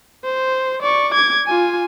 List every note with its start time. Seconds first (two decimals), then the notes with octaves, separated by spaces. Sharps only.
0.24 C5
0.82 D5 C#6
1.13 D6 G#6
1.47 F4 G#5